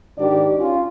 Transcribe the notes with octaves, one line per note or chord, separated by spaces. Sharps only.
G#2 D#3 D4 G4 D5
C#4 F4